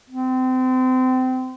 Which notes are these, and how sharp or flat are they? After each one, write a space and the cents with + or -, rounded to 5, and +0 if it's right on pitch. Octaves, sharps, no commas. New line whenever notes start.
C4 -30